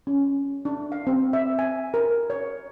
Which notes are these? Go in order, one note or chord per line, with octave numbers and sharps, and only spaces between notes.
C#4
D4
F5
C4
E5
G#5
A#4
C#5